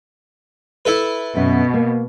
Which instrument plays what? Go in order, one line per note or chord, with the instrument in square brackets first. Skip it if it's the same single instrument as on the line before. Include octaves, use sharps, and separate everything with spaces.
[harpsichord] E4 A4 B4
[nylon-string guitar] F#2 E5 [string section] B2
[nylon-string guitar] A#3